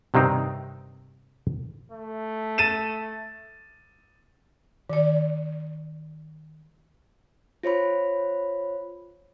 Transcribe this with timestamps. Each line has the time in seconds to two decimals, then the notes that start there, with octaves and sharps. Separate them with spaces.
0.14 G2 C3 D#3 C4 D#4
1.92 A3
2.58 A6 D#7 E7
4.90 D#3 D5
7.63 F4 C5 C#5 B5